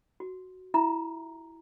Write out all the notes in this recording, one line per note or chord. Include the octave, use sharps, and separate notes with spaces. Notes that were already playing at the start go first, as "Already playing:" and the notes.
F#4
E4 F4 E5 A#5